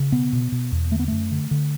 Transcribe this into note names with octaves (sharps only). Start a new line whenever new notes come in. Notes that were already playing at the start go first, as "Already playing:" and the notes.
Already playing: C#3
B2 B3
B2
B2
E2
D3 A3
B3
F#2 A3
D3
D3